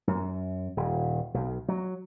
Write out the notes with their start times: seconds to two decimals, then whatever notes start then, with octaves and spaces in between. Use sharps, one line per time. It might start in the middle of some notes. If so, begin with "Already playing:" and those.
0.07 F#2
0.77 D#1
1.34 B1
1.69 F#3